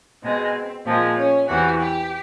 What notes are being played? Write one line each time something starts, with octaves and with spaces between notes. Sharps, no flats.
B2 G#3 C4
A#2 F3 G#3 C4
C#4
E2 C3 E3 F#4
G4